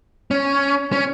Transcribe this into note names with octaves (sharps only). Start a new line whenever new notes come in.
C#4
C#4